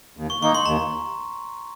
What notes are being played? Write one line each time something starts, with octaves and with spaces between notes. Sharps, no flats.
D#2
C#6
D#3 A#3 D#4 C#6
C6
D#2 A#5